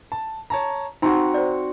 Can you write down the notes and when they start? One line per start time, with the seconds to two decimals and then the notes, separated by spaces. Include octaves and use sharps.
0.12 A5
0.50 C#5 A5 A#5
1.02 C4 D#4 F#4 A#5
1.34 C5 D5